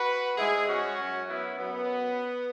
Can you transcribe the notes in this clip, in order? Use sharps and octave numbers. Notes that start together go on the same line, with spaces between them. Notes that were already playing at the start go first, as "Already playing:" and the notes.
Already playing: F#4 B4
G#2 G#3 E4 G#4
C#4 F#4
F#2 F#3
B3 E4
F#2 F#3 B3